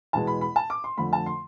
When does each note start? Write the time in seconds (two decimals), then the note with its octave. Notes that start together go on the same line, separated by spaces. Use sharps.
0.13 E2 B2 G#3 B3 A5
0.27 B5
0.41 B5
0.56 A5
0.70 D6
0.84 C6
0.98 F2 D3 A3 B5
1.13 A5
1.26 C6